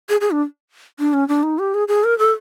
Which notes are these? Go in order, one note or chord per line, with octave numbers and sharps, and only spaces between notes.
G#4
G#4
D4
D4
C#4
D4
D#4
G4
G#4
G#4
A#4
A4